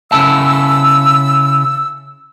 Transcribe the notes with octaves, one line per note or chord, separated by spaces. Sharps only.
C#3 E4 A5 E6